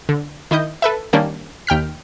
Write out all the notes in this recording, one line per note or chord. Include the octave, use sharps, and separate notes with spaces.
D3
D#3 E4 D#5 G6
A4 B4 E5
D#3 G3 A#3 C#4 D4
D#2 G5 F6 B6